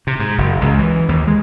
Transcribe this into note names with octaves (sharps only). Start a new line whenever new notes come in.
C3
G#2
F#1
C#2
E3
D#2
G#3